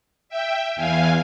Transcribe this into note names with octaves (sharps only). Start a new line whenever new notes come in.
E5 G5
E2 E3 F5 G#5